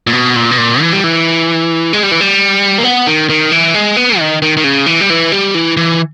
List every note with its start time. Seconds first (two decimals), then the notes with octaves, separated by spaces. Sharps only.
0.07 A#2
0.13 B2
0.36 A#2
0.51 B2
0.58 A#2
0.81 E3
0.93 G3
1.04 E3
1.93 G#3
2.03 G3
2.11 E3
2.21 G3
2.78 A#3
2.84 B3
3.07 D#3
3.29 D#3
3.52 E3
3.74 G#3
3.97 B3
4.19 D#3
4.42 D#3
4.57 D#3
4.64 C#3
4.86 E3
5.01 G3
5.10 E3
5.32 G3
5.55 E3
5.77 E3